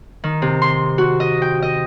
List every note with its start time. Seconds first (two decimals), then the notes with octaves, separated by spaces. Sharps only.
0.24 D#3
0.42 C3
0.62 C6
0.98 F#4
1.20 D#5
1.42 G5
1.62 D#5